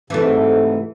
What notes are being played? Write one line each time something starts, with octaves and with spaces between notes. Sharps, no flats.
G#2 C3 E3 A3